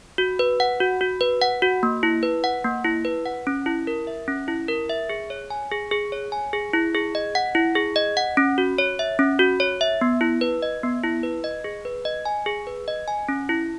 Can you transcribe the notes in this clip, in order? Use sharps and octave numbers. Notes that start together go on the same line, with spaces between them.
F#4
B4
F#5
F#4
F#4
B4
F#5
F#4
A#3
E4
B4
F#5
A#3
E4
B4
F#5
C#4
E4
A#4
E5
C#4
E4
A#4
E5
G#4
C#5
G#5
G#4
G#4
C#5
G#5
G#4
E4
G#4
D#5
F#5
E4
G#4
D#5
F#5
C#4
F#4
C#5
E5
C#4
F#4
C#5
E5
B3
E4
B4
D#5
B3
E4
B4
D#5
G#4
B4
D#5
G#5
G#4
B4
D#5
G#5
C#4
E4